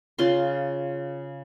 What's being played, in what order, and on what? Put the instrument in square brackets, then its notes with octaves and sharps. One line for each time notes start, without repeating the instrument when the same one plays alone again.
[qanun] C#3 F4 C6